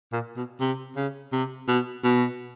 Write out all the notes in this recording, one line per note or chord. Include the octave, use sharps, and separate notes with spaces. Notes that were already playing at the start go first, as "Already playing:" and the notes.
A#2
B2
C3
C#3
C3
B2
B2